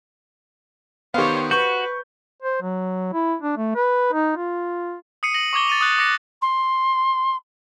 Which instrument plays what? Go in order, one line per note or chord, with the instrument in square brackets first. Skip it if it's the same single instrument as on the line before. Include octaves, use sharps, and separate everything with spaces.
[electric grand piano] D#3 B3 [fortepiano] G4 F5 [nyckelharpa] C5 C#5
[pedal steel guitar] F#4 [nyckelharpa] B4 [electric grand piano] C#6 G6
[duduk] C5
F#3
E4
D4
A3
B4
D#4
F4
[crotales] D#6 C7 C#7 D#7
A#6 F#7
C#6 D6 G#6 G7
A6 D#7 F7
D#6 F#6 A6
D6 F#6 A#6 C#7 F#7
[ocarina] C6